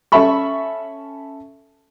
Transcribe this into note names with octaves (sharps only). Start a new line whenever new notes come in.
C#4 A4 E5 A5 B5 C#6